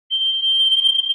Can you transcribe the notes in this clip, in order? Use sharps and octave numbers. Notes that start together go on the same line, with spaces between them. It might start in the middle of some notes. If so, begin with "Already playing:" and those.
G7